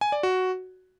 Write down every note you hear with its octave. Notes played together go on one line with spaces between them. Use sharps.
G#5
D5
F#4